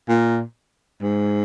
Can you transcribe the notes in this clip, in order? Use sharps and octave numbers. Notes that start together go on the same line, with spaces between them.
A#2
G#2